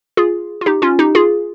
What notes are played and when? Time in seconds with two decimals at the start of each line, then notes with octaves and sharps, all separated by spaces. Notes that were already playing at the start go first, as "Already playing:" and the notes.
0.17 F4 G#4
0.61 F4
0.66 D#4 G4
0.82 C#4 F4
0.99 D#4 G4
1.15 F4 G#4